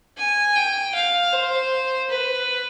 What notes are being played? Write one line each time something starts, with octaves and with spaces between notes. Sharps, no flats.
G#5
G5
F5
C5
B4